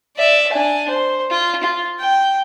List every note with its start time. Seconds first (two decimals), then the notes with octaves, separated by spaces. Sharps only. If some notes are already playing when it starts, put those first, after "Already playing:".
0.17 D5 E5
0.53 D4 G#5
0.89 C5
1.31 F4
1.63 F4
2.00 G5